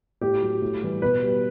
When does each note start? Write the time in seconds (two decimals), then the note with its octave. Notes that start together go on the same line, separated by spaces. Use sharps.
0.21 A2 G4
0.42 F#3
0.62 A2
0.82 E3 G3
1.02 B2 B4
1.23 G3